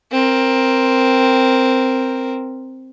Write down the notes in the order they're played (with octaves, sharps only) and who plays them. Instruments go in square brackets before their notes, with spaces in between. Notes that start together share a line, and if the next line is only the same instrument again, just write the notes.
[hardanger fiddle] C4 A#4